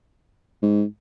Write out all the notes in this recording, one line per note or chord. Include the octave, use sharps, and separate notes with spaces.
G#2